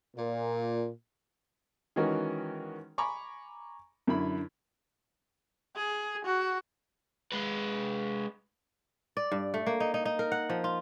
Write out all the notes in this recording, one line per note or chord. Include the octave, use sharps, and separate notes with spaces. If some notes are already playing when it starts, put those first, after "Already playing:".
A#2
D#3 E3 G#3 C#4 F#4 A#4
G#5 A#5 B5 C#6 D6
F#2 D3 E4 B5
G#4
F#4
G#3 B4
D5
G2
A3
A#3
D#4
D#4
D#4
A#4
F#5
F3
F4